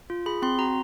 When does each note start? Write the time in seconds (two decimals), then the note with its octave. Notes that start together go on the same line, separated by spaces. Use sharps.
0.10 F4
0.26 G#4 B5
0.42 C4 C6
0.59 F#4 A#5